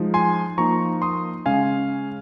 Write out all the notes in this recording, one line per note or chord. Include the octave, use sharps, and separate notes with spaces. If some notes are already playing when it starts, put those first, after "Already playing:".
Already playing: F3 G#3 D#4
G#5 C6
F3 A#3 D#4 A#5 C#6
C6 D#6
C#3 G#3 C#4 F5 G#5